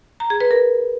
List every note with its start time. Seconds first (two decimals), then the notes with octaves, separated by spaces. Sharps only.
0.20 A#5
0.30 G#4
0.41 B4
0.51 A#4